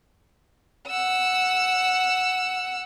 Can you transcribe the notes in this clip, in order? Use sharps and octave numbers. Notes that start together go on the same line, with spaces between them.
F#5 E6